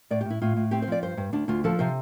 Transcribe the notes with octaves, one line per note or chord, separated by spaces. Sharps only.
A2 D5
G4
A2
E4
A2 F4
A2
C4 G4
C5
F3 D5
G2 C5
G2
D2 D4
D2 F4
F3 A4
C3 C5